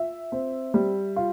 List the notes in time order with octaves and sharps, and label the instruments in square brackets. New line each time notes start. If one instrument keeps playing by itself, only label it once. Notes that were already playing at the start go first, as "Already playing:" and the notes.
Already playing: [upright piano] F4 E5
C4
G3
F4